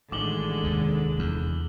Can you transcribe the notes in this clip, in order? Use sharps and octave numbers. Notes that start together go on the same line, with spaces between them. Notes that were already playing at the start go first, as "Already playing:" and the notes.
A1 D3 D#3 G#3 D6 F#7 G7
F1 D#2
E2